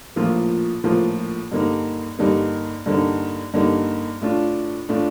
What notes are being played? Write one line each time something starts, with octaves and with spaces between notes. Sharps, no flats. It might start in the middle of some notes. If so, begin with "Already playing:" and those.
A#1 A2 F3 A#3 F4
A#1 A2 F3 A#3 F4
G2 D3 G3 A#3 D#4
G2 D3 G3 A#3 D#4
G2 D3 G3 A#3 D#4
G2 D3 G3 A#3 D#4
A2 A3 D4 F4
A2 A3 D4 F4